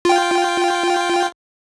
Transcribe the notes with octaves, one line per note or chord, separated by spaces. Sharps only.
F4 G5